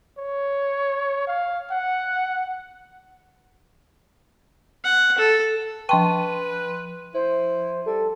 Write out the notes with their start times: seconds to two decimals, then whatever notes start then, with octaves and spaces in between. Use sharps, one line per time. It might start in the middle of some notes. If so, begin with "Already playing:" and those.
0.18 C#5
1.27 F5
1.71 F#5
4.84 F#5
5.18 A4
5.89 F3 B4 G5 A5 C6 C#6 D#7
7.14 E4 C5
7.86 G3 A4